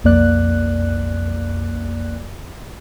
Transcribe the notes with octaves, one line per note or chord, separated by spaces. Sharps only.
B1 F2 A#3 D5 F#6